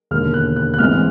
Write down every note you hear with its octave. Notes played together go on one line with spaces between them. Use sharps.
E1 D#2 D3 F6
F#6
F#6
F#6
A1 G#2 E3 G#3 C4 F6